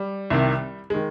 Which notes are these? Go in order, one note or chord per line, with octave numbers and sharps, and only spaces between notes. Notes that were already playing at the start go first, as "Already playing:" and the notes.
Already playing: G3
C2 C3 D#3
D#3 G#3